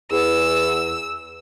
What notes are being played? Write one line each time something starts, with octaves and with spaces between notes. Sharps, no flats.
E2 E6